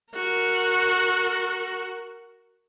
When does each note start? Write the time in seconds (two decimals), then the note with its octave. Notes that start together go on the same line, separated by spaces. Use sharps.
0.13 F#4 A#4